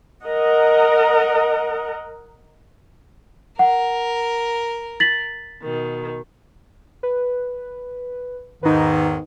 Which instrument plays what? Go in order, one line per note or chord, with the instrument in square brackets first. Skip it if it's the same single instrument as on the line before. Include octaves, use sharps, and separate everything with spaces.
[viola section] A#4 D#5 F#5
[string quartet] A#4 [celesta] F#5
[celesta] A6 B6 F#7
[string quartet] B2 D#3
[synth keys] B4
[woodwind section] E2 G#2 D#3 [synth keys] D#4 B4